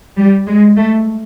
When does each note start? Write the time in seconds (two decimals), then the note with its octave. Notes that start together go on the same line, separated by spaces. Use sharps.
0.18 G3
0.47 G#3
0.77 A3